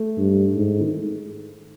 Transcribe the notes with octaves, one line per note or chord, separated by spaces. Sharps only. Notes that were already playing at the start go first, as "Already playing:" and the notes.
Already playing: A3
G2
G#2
D#3